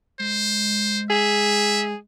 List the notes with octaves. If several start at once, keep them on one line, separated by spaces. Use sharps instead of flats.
G#3 C5
G#4 E5